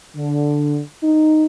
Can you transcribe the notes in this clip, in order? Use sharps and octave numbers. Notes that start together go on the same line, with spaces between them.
D3
D#4